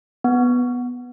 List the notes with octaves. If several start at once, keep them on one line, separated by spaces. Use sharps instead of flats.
B3